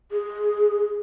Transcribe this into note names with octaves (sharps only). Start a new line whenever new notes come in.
G#4